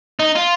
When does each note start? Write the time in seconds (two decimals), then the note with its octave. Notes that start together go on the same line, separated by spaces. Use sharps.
0.19 D#4
0.36 F4